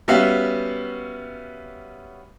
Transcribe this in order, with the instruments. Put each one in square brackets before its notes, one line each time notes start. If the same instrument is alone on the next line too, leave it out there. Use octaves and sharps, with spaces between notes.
[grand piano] G3 B3 C#4 F#4 E5 F5